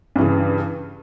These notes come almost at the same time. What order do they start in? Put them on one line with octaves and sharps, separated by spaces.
G2 E3 C#3